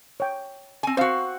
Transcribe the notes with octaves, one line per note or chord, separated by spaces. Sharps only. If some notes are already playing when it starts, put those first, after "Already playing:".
C#5 G5
C4 G#5
C4 F#4 C5 F5